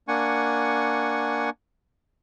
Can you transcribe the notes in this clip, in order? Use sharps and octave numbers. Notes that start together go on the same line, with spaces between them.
A#3 D4 F#5 G#5 C#6